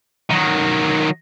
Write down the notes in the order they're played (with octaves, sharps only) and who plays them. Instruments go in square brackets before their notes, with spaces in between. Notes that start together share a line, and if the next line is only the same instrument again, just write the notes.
[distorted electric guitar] D#3 F#3